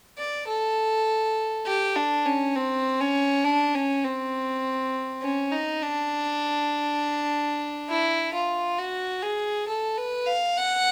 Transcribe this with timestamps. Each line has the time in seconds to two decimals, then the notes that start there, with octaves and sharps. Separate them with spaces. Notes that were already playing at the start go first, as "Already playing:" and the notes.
0.18 D5
0.48 A4
1.66 G4
1.96 D4
2.26 C#4
2.56 C4
3.00 C#4
3.44 D4
3.75 C#4
4.04 C4
5.22 C#4
5.52 D#4
5.82 D4
7.89 E4
8.34 F4
8.79 F#4
9.22 G#4
9.68 A4
9.97 B4
10.26 F5
10.57 F#5